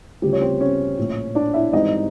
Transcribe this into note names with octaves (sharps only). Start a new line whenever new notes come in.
D2 C#3 F3 G3 G4
C#5
C4 C5
C#4 C#5
A#1 A2 F3
D4 D5
E4 E5
G#1 G#2 E3 G3 D#4 D#5